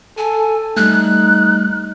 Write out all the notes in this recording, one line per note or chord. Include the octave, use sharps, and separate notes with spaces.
A4 G#5
G3 A3 D#4 F#6